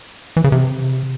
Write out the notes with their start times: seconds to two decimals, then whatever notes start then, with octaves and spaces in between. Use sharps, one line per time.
0.37 E3
0.44 C#3
0.52 C3